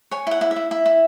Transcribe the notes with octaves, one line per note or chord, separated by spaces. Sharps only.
C#5 G#5
E4 F#5
E4
E5
E4
E4 E5
E4